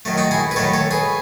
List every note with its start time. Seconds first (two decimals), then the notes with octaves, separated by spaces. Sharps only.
0.05 D#3 F#3 A3
0.18 D#4 F#4
0.31 E4 G#4
0.51 B4
0.56 D#3 F#3 A3 A4 C#5
0.73 A4 C#5
0.91 G#4 B4